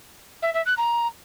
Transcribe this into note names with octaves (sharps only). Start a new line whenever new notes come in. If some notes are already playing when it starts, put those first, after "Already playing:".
E5
E5
F#6
A#5